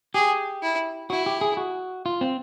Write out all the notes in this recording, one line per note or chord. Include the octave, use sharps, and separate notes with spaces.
G4 G#4
E4
E4 F#4
G4
G#4
F#4
F4
C4